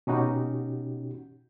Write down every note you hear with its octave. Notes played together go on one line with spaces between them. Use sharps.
B2 C#4 D#4 F#4 G4